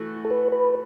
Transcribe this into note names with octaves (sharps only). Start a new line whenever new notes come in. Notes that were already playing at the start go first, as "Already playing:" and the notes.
Already playing: E3 A3 F#4
A4
B4
B4